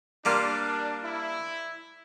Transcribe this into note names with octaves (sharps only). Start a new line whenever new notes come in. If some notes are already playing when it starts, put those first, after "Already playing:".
G3 A#3 D4 F4
E4